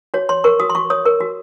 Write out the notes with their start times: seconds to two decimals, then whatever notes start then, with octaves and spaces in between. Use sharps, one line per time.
0.14 F#4 C#5
0.29 C#5 C6
0.44 A#4 C#6
0.60 F#4 D#6
0.70 C6
0.75 F#4 C#6
0.90 C#5 D#6
1.05 A#4
1.20 F#4